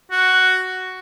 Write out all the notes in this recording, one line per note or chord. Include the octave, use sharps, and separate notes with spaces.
F#4